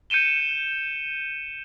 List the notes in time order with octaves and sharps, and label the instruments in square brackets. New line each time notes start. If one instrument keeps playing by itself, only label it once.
[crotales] G6 C#7 D#7 E7 G7